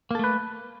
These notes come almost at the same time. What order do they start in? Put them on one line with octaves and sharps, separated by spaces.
A#3 A4 A3 B4